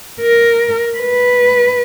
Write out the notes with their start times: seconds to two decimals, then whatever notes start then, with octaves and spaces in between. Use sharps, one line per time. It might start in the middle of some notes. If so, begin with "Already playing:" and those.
0.21 A#4
0.98 B4